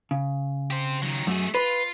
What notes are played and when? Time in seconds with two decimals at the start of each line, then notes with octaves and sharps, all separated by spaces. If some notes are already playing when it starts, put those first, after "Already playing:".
0.11 C#3
0.71 G4 C5
1.03 D#3 F#3
1.27 F#2 A3 G#4
1.55 F4 B4